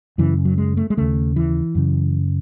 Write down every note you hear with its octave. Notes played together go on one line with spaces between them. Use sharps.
F#2 C#3 E3
F#3
G#3
A3
G#3
D#2 C#3 A3
E3
F#2 C#3